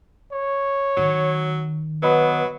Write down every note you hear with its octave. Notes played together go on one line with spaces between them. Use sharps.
C#5
D#3 F#3
F#3 B3 B4 D#5 B5